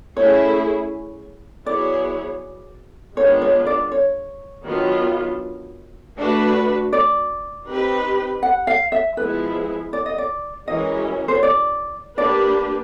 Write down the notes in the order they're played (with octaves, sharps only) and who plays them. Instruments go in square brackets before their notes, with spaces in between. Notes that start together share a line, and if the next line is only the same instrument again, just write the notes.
[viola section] A3 C#4 E4 G#4 [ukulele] C#5
[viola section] F#3 B3 E4 G#4 C#5 [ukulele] D5
[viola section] D#3 G#3 B3 D4 F4 [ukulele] C#5
[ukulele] C#5
D5
C#5
[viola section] D#3 F#3 B3 D4 F4
A3 D4 F#4 B4
[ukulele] D5
[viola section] C4 D#4 G4 B4
[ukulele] F#5
F5
E5
[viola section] F3 G#3 B3 E4 G#4 [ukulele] B4
[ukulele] D5
D#5
D5
[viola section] E3 G#3 C#4 F#4 A#4 [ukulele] D#5
[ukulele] C5
C#5
D5
[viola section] A#3 D4 G4 B4 [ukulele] D5